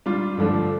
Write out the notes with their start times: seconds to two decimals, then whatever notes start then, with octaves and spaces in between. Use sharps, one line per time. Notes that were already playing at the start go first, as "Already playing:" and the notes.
0.06 G3 D4 F4
0.37 G2 D3 F3 A3 D4